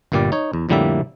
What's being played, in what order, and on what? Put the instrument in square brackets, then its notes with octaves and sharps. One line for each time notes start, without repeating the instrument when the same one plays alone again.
[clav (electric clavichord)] G1 G2 A#2 G3 D5
D#4 C#5
E2
F2 A2 D3 G3 A#3 E5